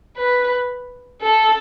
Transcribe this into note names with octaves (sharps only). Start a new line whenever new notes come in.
B4
A4